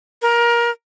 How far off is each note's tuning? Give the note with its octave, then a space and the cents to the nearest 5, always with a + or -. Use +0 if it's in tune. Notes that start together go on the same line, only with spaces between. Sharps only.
A#4 +20